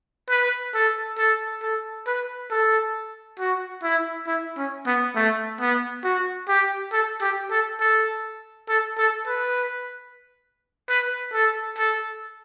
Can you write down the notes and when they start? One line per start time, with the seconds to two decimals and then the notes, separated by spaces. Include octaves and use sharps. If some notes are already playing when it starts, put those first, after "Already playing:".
0.30 B4
0.74 A4
1.18 A4
1.63 A4
2.07 B4
2.51 A4
3.39 F#4
3.83 E4
4.27 E4
4.57 C#4
4.86 B3
5.15 A3
5.61 B3
6.04 F#4
6.48 G4
6.93 A4
7.21 G4
7.51 A4
7.80 A4
8.69 A4
8.98 A4
9.28 B4
10.90 B4
11.34 A4
11.78 A4